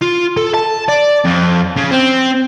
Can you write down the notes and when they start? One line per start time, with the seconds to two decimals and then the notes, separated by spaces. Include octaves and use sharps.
0.02 F4
0.37 A4
0.54 A5
0.89 D5
1.25 F2
1.76 C#3
1.90 C4